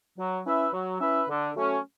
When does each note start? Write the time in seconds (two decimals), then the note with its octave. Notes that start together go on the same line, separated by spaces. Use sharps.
0.18 F#3
0.45 C#4 E4 B4 E5
0.73 F#3
1.00 C#4 E4 B4 E5
1.28 D3
1.55 F#3 A3 C#4